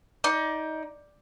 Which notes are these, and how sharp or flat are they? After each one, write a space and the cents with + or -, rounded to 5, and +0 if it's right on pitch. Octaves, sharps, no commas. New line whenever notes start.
D#4 +20 D5 +0